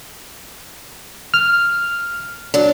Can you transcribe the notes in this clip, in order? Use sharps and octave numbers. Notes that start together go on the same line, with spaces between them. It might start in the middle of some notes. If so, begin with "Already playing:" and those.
F6
F#3 D4